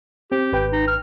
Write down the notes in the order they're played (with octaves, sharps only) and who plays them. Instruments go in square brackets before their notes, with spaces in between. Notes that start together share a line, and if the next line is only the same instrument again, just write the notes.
[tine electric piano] C4 [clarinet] G4
[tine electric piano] G#1 B4 G5
[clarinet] D#4
F6